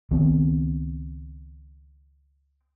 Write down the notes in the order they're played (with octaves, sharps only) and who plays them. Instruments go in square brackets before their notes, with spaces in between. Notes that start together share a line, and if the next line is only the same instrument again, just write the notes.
[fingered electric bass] C#2 D#3 B3 C4